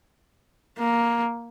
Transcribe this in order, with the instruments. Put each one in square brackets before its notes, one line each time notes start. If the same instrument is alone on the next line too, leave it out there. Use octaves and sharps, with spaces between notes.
[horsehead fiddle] A#3